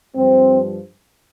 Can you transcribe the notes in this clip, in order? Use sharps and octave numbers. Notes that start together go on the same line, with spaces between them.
G2 F3 C4